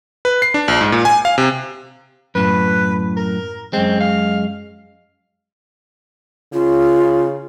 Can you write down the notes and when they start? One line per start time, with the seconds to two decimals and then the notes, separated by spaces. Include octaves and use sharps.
0.25 B4
0.42 C7
0.54 D4
0.68 A#1
0.81 G#2
0.92 A#2
1.05 G#5
1.25 F5
1.38 C3
2.35 F#2 A2 B4
3.17 A#4
3.73 F#2 G#3 C4
4.00 F5
6.53 C#3 F4